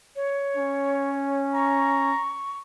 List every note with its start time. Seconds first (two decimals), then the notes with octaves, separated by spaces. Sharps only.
0.16 C#5
0.57 C#4
1.55 A#5 C#6